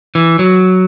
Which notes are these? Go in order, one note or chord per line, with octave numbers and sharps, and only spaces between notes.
E3
F#3